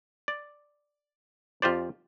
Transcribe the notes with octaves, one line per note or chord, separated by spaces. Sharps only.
D5
F2 F4 G4 C5 D5